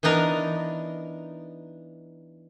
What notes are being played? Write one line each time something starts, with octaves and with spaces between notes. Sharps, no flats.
E3 B3 D4 D#4 A#4